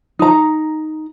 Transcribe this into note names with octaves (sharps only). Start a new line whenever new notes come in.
D#4 A#5